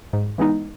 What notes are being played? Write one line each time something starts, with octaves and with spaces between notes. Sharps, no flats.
G#2
E3 G#3 B3 D#4